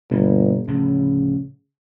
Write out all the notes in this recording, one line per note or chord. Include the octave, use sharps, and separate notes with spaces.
G1 B2 A#3
D2 A2 C#3 F3